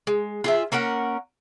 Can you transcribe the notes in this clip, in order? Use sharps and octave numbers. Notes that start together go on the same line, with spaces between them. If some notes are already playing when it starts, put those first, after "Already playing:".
G#3
F4 G#4 E5
A#3 C#4 A#4 F#5